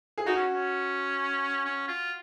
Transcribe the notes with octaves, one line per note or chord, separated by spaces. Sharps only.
G#4
D#4 F#4
C#4
C#4
C#4
F4